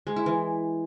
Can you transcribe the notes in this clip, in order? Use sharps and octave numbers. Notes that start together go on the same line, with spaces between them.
G#3
E4
E3